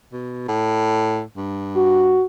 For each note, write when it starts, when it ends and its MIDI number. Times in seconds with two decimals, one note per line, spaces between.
0.12 0.47 47
0.48 1.22 45
1.37 2.21 43
1.76 2.25 66